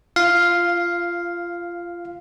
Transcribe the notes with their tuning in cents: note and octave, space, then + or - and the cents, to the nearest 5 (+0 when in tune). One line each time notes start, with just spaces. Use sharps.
F4 -20 F5 +0